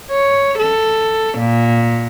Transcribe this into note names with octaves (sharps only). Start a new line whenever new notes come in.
C#5
A4
A#2